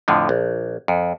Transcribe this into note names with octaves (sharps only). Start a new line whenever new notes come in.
F2 A2 D3 F3
A#1
F2